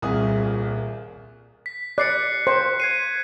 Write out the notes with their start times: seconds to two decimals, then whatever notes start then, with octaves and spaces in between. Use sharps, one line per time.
0.02 D#1 C2 A#2 A#3 G#4 D#6
1.66 B6
1.98 D5 F#6 C7 C#7
2.47 C5
2.80 G#6 C7 D#7